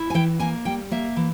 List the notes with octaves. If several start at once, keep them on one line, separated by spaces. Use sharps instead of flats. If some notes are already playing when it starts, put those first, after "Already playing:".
Already playing: E4
G#5
E3 G5
A#3 G#5
G3 G5
A#3 E5
E3